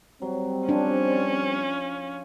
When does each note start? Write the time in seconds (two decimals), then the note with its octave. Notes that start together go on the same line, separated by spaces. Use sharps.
0.22 F#3 G3 C4
0.69 F3 C#4 D4 C5
1.11 F4